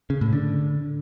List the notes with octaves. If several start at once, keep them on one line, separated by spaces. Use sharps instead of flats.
C#3
A2
D3